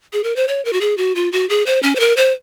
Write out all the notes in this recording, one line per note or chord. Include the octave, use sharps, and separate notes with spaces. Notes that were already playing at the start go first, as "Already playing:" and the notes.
G#4
A#4
C5
C#5
A#4
F#4
G#4
F#4
F4
F#4
G#4
C5
C#4
C5
A#4
C5